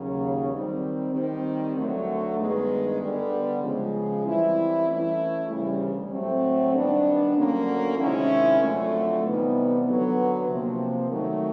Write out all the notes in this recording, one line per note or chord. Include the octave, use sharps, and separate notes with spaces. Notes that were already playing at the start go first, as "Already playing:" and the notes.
Already playing: D#2 C#3 F#3
D#3 G3 C4
D#3 G3 C4
D2 D3 F#3 A3
G2 D#3 G#3 B3
D3 G3 B3
C#3 F3 G#3
E3 G3 C4 E4
E3 A3 C#4 E4
D2 C#3 E3 G3
A2 F#3 A3 C4
D#3 G3 B3 D4
D2 D3 F#3 A#3 C#4
C3 D#3 G#3 C#4 E4
F2 D3 F#3 A3
C3 E3 G3 B3 D#4
D3 F#3 B3
C3 F3 A#3
D#3 F#3 A3